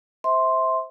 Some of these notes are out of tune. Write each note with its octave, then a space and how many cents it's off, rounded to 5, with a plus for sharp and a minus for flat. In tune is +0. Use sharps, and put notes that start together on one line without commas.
C5 +0 E5 -20 C6 +0